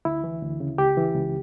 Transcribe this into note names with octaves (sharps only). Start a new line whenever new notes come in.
D2 E4
E3
D2
C#3
C#2 G4
E3
C#2